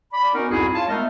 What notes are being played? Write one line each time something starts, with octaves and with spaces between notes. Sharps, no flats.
D5 B5
B3 C#4 D#4 F#4 A#4
C2 F2 G#2 E4 F#4 G#4
F4 C#5 A5
G#3 A3 B3 D#4 A#4 D#5